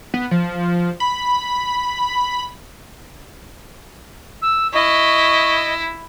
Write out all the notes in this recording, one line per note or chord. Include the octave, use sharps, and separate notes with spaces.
B3
F3
B5
E6
E4 D#5 C#6